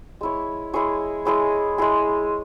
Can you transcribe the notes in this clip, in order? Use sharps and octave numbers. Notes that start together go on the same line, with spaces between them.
G#3 E4 C#5
G#3 E4 G#4 C#5
G#3 E4 G#4 C#5
G#3 E4 G#4